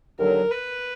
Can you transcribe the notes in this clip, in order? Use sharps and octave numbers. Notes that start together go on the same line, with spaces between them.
D#2 D3 F#3 A#4
B4